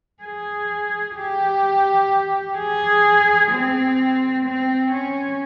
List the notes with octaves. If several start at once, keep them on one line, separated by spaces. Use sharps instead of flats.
G#4
G4
G#4
C4
C4
C#4